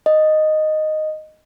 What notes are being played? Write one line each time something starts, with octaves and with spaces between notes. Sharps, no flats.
D#5